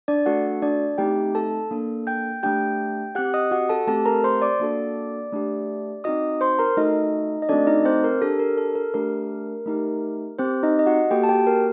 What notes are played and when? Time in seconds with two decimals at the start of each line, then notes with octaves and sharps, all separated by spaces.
0.08 D4 D5
0.26 A3 D4 F#4 A4 F#5
0.62 D4 D5
0.98 A3 C4 D#4 G4 G5
1.35 A4 A5
1.71 A#3 D4 A4
2.07 G5 G6
2.43 A3 D4 G4 G5 G6
3.15 C4 G4 F#5 F#6
3.34 D#5 D#6
3.51 F#4 F#5
3.69 A4 A5
3.87 A3 C4 G4 A4 A5
4.06 A#4 A#5
4.24 C5 C6
4.42 D5 D6
4.60 A#3 D4 F#4 A4
5.32 A3 D4 G4
6.04 C4 D#4 F#4 D#5 D#6
6.41 C5 C6
6.59 A#4 A#5
6.77 A3 D#4 F#4 A4 D#5
7.42 D#5
7.49 A3 C4 D4 F#4 A4 D5
7.67 D#4 D#5
7.85 C4 C5
8.04 A#4
8.21 D4 G4 A4
8.40 A#4
8.58 A4
8.75 A#4
8.94 A3 D4 G4 A#4
9.66 A3 D#4 G4
10.39 C4 G4 C5
10.63 D#4 D#5
10.79 D#5
10.86 F#4 F#5
11.11 A#3 F#4 G4 A4 G5
11.23 A5
11.29 G4 G5
11.47 A#4